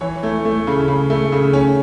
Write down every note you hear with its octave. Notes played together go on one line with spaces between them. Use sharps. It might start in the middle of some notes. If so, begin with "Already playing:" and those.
E3 C#5
A3
A3
C#3
C#3
A3
C#3
C#4